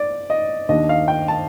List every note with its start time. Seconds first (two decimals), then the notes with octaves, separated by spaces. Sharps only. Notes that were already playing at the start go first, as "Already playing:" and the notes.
Already playing: D5
0.30 D#5
0.69 D#2 D#3 A#3 D4 D#5
0.89 F5
1.08 G5
1.28 A5